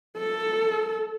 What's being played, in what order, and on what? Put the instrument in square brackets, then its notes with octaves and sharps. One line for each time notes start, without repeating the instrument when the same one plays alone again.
[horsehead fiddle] A4